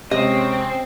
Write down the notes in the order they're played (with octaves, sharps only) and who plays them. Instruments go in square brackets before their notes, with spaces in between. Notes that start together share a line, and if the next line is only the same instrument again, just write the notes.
[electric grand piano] C3 G#3 [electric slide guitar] C4 [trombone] C#4 [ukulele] D#5